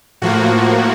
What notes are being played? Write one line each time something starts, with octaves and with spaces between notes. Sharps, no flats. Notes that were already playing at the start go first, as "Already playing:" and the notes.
A2 F3 A#3 F#4